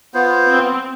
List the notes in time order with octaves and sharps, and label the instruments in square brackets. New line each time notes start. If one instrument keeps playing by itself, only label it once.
[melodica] B3 F4 C5
[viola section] C4